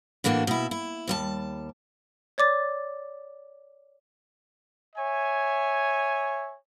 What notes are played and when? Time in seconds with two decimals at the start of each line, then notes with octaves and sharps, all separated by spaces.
0.24 A2 E3 A#3 D4 F#4
0.47 B2 E4
0.71 E4
1.08 D#2 G3 A5
2.38 C#5 D5 D6 A6
4.96 C#5 E5 G#5